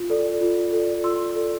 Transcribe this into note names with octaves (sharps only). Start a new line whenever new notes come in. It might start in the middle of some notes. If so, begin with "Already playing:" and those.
Already playing: F4
A4 D5
F4
A4 D5
F4 C6 E6
A4 D5